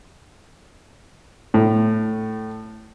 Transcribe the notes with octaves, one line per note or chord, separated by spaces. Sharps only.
A2